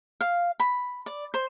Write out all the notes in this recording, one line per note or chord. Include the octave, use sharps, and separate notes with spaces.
F5
B5
D5
C5